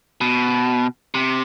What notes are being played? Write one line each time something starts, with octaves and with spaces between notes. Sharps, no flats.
B2
C3